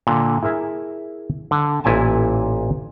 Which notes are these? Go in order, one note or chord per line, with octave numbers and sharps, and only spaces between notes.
A#2 D3
E4 G#4 A#4 E5
D3
A1 A#2 E4 G#5 A5